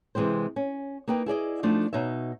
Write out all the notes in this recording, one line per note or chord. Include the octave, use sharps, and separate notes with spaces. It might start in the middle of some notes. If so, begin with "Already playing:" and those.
C3 E3 G#3 C4 C5
C#4
A#3 D#4 B4 G5
E4 G#4 D5 D#5
F3 A3 D4 D#4
B2 D#4 C#5 E5